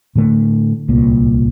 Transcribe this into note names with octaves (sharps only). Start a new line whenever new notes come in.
A2 D3 A3
D1 C2 A#2 A#3